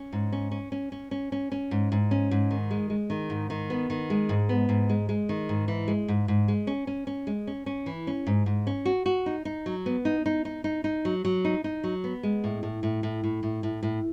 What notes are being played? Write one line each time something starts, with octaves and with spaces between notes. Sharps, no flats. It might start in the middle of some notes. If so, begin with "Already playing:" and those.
Already playing: C#4
G#2
C#4
C#4
C#4
C#4
C#4
C#4
C#4
G#2
G#2
C#4
G#2
D#3
G#3
G#3
D#3
G#2
D#3
B3
D#3
G#3
G#2
B3
G#2
G#3
G#3
D#3
G#2
E3
G#3
G#2
G#2
G#3
C#4
C#4
C#4
G#3
C#4
C#4
E3
C#4
G#2
G#2
C#4
F#4
F#4
D#4
D#4
F#3
B3
D#4
D#4
D#4
D#4
D#4
F#3
F#3
D#4
D#4
F#3
B3
G#3
A2
A2
A2
A2
A2
A2
A2
A2